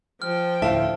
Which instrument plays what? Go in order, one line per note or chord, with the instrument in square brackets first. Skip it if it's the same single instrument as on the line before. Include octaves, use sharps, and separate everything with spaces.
[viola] F3 G5 [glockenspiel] F6
[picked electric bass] D2 A2 [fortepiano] E5 F5 [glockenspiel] A5